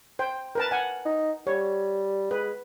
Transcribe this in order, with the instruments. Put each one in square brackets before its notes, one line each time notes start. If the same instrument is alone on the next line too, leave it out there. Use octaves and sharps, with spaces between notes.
[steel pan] C5 G5
A#4 B4 A5
F#5 G#5
[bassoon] D#4
[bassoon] G3 [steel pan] C#5
[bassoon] G#3 [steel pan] B4